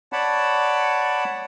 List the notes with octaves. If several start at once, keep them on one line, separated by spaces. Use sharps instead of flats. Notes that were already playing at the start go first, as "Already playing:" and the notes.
C#5 D5 F#5 A5 B5